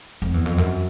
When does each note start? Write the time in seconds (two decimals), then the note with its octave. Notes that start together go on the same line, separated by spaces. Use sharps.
0.22 F2
0.34 E2
0.46 F2
0.58 F#2